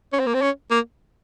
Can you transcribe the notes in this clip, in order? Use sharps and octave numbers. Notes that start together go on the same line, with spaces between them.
C#4
C4
A#3
C4
C#4
A#3